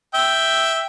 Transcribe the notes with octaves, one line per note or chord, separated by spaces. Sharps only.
E5 G5